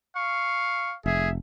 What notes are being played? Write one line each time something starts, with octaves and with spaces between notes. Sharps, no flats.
F5 C#6
F1 G#4 E5